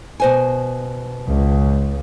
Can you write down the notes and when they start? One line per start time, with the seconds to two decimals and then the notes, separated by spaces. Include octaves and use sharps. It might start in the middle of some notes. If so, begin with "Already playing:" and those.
0.20 B2 C5 G#5
1.27 C#2